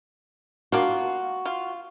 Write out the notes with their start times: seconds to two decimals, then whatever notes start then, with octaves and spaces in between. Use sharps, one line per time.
0.72 A#3 D4 F4 F#4
1.45 F4